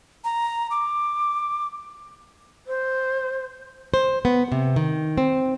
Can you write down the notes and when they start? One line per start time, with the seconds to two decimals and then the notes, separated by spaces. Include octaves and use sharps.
0.24 A#5
0.71 D6
2.67 C5
3.94 C5
4.25 B3
4.52 C3
4.76 D#3
5.18 C4